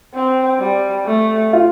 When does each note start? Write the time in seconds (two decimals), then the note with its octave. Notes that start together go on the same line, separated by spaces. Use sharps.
0.14 C4
0.59 G3
1.06 A3
1.53 F4